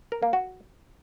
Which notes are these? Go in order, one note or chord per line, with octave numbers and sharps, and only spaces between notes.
A#4
A#3
F#4